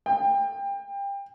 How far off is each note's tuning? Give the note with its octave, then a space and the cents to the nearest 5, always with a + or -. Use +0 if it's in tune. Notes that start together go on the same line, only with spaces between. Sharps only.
G5 +25